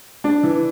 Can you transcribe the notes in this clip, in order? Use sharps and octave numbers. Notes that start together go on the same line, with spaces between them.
D4
E3